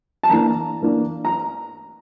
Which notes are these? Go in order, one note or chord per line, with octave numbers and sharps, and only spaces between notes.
A5
E3 A#3 D4 A#5
E3 A#3 D4
A#5